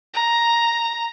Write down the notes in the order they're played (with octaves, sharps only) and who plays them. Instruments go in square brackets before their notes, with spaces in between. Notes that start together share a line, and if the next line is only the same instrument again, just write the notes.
[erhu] A#5